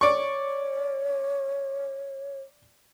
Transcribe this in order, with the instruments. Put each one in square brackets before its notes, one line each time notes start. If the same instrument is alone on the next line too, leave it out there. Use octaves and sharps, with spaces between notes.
[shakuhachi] C#5 [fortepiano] D5 C#6